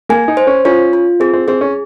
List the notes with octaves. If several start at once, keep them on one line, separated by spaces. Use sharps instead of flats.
A#3 G#5
D#4
C5
C#4
C#4 F4
F4
C4 G#4
C4
C4 G#4
C#4